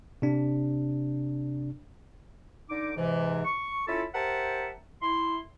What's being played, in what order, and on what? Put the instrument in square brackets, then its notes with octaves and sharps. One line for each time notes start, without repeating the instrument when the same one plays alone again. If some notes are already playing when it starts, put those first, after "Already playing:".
[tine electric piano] C3 D4
[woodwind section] D3 D#4 D6
G#2 C3 E3
C#6
C#4 E4 F4 A4 A5 B5
G4 A#4 C5 E5 F#5 A5
E4 C6